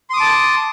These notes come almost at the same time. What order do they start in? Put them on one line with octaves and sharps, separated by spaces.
C6 D#6 D6 A5